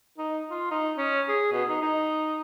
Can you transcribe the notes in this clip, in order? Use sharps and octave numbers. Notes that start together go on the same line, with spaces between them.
D#4
F4
D#4
C#4
G#4
B2
D#4
D#4